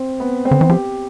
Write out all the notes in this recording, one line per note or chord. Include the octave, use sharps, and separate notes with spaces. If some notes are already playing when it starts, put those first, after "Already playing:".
Already playing: C4
B3
C4
D3
E3
F3 G4